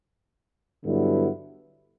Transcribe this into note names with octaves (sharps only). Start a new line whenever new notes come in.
G2 D3 F#3 B3 E4